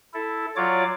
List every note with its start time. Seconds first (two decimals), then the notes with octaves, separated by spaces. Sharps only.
0.14 E4 A4
0.56 F#3 F4 C#5 D5 D6